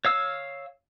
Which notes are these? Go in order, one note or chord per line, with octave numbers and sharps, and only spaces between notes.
C#5 F5 E6